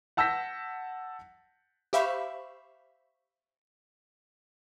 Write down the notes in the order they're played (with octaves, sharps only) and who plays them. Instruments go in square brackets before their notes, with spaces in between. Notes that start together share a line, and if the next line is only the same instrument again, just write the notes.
[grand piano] F#5 A5 E6 G6 A#6 B6
[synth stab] G4 C5 E5 F5 B5 C#6